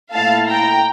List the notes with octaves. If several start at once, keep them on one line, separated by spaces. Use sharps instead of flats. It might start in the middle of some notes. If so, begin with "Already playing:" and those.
A#2 A3 E4 F5 A5
G5 A#5